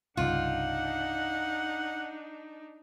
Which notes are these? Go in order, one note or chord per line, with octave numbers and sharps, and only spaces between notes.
C2 G2 C#3 D4 D#4 F4 F#5